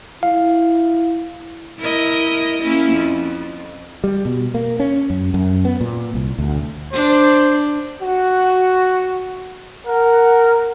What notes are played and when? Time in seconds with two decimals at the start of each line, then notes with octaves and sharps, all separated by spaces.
0.23 E4 F5
1.79 E4 A#4 D#5
2.61 A#3 C#4 E4
2.93 F2
4.04 G3
4.25 B2
4.54 A#3
4.80 C#4
5.10 F#2
5.34 F#2
5.65 B3
5.81 A#2
6.14 C2
6.38 D2
6.93 D4 C5
8.02 F#4
9.86 A#4 F#5